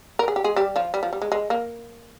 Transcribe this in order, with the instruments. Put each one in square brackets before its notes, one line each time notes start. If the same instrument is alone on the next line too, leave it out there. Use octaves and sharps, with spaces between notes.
[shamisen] A#4
G#4
G4
G#3 G#4
G3 G4
F3 F4
G3
F3
G3
G#3
G#3
A#3